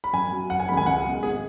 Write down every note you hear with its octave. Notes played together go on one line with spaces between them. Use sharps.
B5
F#2 G#5
F#3
F#1 F#5
G#5
F#2 D#3 G#3 B5
G#5
C#2 F#5
B2 G#3
G#1 G#4